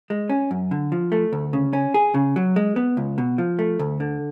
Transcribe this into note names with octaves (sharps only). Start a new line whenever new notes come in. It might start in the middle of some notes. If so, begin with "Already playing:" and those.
G#3
C#4
F#2
D3
F3
A3
D2
C#3
C#4
G#4
C#3
F#3
G#3
B3
C#2
B2
F3
A3
D2
D3